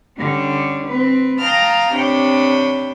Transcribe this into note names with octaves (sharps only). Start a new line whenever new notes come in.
D3 G3 C#4 D4
C4 B4
F5 G5 A5 A#5 D#6 F6
C3 D4 C#5 G5 B5